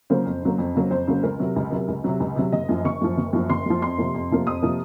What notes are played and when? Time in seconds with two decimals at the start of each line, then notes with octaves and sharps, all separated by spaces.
0.10 C#3 F#3 A#3 C5
0.26 F2
0.42 C#3 F#3 A#3
0.58 F2
0.75 C#3 F#3 A#3
0.90 F2 C5
1.07 C#3 F#3 A#3
1.23 C#2 A#4
1.40 C3 F#3
1.56 C#2
1.72 C3 F#3
1.88 C#2
2.04 C3 F#3
2.20 C#2
2.36 C3 F#3
2.52 F#1 D#5
2.69 F#2 F3
2.85 F#1 C#6
3.01 F#2 F3
3.17 F#1
3.33 F#2 F3
3.50 F#1 C6
3.66 F#2 F3
3.82 F2 C6
3.98 C3 F3 A#3
4.14 F2
4.30 C3 F3 A#3
4.47 F2 D#6
4.62 C3 F3 A#3